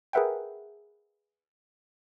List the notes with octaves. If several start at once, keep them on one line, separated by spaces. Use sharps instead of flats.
G#4 A#4 B4 E5 F#5 G5